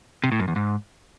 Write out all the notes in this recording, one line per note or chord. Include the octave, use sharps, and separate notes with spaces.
C3
A2
F#2
E2
G#2